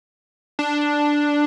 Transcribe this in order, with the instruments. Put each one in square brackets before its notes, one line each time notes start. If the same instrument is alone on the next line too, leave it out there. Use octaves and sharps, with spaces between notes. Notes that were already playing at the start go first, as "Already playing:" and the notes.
[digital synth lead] D4